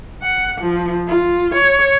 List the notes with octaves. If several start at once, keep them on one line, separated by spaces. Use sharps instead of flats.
F#5
F3
F4
C#5